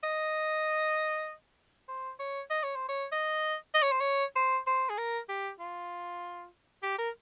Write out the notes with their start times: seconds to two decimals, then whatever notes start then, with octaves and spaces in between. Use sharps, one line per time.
0.03 D#5
1.88 C5
2.19 C#5
2.50 D#5
2.63 C#5
2.75 C5
2.89 C#5
3.12 D#5
3.74 D#5
3.82 C#5
3.91 C5
4.00 C#5
4.36 C5
4.67 C5
4.89 G#4
4.97 A#4
5.29 G4
5.59 F4
6.83 G4
6.98 A#4